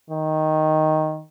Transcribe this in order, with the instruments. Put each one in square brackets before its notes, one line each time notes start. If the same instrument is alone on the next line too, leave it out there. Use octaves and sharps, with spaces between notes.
[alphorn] D#3